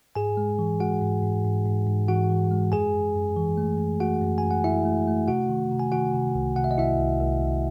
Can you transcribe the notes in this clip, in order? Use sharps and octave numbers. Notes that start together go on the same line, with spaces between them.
G#2 G#4 G#5
G#3
E3
G#3 F#4 F#5
G#2
G#2
G#2
G#2
G#2
E3 F#4 F#5
E3
G#3
F#2 G#4 G#5
F#2
F#2
E3
A3
F#2
A3 F#4 F#5
F#2
G#5
F#2
F#5
F#2 E4 E5
A3
A3
C3 F#4 F#5
D#3
C3
G#5
D#3 F#4 F#5
C3
C2
C3 F#5
E5
D#5
C2 E4 E5
C2
C2
C2